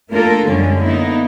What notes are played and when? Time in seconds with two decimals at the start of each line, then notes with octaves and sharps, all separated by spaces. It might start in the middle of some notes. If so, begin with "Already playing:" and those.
0.11 A3 A#3 D4 F4 A4 A#4
0.45 F#2 D3 F3 G3 G#3 C#4
0.82 A#3 B3 D#4 E4